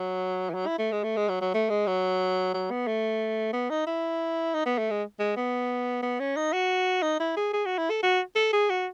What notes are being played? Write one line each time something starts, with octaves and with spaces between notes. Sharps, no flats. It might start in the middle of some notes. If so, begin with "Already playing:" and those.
Already playing: F#3
E3
F#3
E4
A3
G#3
A3
G#3
F#3
F#3
A3
G#3
F#3
F#3
B3
A3
B3
D#4
E4
D#4
B3
A3
G#3
G#3
B3
B3
C#4
D#4
F#4
D#4
E4
G#4
G#4
F#4
E4
A4
F#4
A4
G#4
F#4